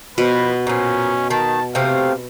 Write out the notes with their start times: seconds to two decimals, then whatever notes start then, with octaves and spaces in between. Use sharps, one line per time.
0.18 B2 F3 B4
0.67 A#2 F3 C#4
1.30 D#3 A5
1.75 C3 A3 C4 F5